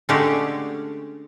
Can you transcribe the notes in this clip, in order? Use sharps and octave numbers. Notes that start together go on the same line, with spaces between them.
D3 G#3 A3 C#4 G4 A4